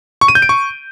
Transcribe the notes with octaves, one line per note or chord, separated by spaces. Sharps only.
C#6
D#7
G6
D7
C#6